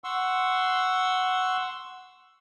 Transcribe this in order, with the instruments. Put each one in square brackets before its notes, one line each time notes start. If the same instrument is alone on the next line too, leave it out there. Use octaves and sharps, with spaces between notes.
[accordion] F#5 C6 C#6 E6